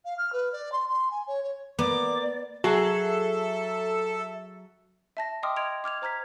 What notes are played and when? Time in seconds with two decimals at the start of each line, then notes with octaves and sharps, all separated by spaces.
0.05 F5
0.18 F6
0.33 B4
0.52 D5
0.72 C6
0.88 C6
1.11 G#5
1.27 C#5
1.43 C#5
1.79 A#3 B3 D5 D6
2.64 F#3 F#4 G#4 A4 E5
5.17 E5 A5 A#6
5.43 D#5 G5 C6 D6 D#6 F6
5.56 D#5 C6 G#6 D7 F7
5.84 D6 F6 G#6 F7
6.02 C5 A#5 F6 G#6 B6